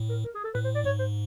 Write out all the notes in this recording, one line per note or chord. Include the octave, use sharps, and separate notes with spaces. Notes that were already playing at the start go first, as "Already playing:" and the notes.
Already playing: A2
A#4
A#4
G#4
A4
A2 B4
C5
D5
G#2 C#5
C5